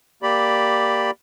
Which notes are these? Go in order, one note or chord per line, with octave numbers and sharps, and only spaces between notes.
A#3 G4 D5 B5